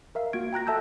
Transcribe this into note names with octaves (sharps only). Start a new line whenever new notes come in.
A#4 E5 F5
A#3 F4 F#4 G#6 D7
G5 A#5 F#6 A#6
A4 E5 A5 E6 G6